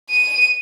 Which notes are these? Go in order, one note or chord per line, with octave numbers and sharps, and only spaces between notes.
D#7